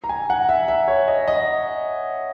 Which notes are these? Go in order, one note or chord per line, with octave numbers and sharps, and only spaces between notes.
A#5
G#5
F#5
E5
E5
C#5
D#5
D#5